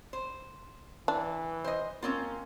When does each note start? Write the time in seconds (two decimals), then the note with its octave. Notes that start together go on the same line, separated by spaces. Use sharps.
0.13 C5
1.08 E3 D4
1.64 C5 D#5
2.02 A#3 C4 C#4 F4